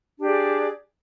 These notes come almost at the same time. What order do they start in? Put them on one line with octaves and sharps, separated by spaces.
D4 G4 D5 G#4